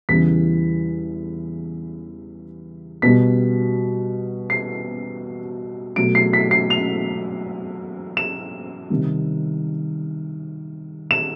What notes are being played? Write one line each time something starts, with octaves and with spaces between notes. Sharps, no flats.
E2 C#3 E3 G3 B6
B2 G3 B6
C7
B2 F#3 A3 D7
C7
B6
C7
F7
E7
C3 D#3 G3
E7